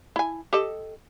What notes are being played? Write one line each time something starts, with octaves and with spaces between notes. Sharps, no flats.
E4 G#5
G4 A4 D#5